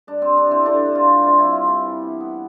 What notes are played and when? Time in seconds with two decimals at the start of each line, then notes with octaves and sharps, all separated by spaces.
0.07 G2 D4
0.22 C4
0.27 G2
0.37 D4
0.47 E3 C4
0.66 D3 D4
0.86 D3
0.95 F4
1.04 G3
1.23 C3 F4
1.39 C3 E4
1.52 F4
1.63 C3
1.68 E4
1.82 E3
2.02 B3
2.20 B3